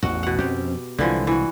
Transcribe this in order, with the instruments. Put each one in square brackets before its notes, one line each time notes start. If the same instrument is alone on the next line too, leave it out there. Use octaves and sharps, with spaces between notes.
[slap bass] A1 E2 [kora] F#4
[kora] B2 F#5
[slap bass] F2 C4 C#4 [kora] G4
[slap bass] C2 G#3 [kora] D3 E3 F3
[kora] E3 F#4